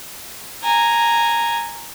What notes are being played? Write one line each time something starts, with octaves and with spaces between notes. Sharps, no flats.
G#5 A#5